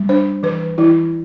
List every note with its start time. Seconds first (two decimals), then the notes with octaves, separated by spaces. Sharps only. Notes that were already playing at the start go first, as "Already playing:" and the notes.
Already playing: G3
0.09 D4 C5
0.43 E3 B4
0.78 E3 E4